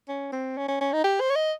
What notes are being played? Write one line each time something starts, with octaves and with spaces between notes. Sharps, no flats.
C#4
C4
C#4
C#4
C#4
D#4
G4
C5
C#5
D#5